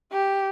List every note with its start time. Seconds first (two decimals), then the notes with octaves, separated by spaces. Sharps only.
0.12 G4